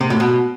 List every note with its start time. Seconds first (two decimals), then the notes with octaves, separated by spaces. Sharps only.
0.01 C3
0.10 A2
0.20 B2